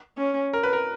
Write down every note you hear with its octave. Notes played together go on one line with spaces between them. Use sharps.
C#4
A#4
B4
A#4